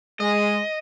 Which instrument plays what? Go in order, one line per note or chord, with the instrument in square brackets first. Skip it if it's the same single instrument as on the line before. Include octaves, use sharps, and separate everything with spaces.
[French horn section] G#3 [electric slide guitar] D#5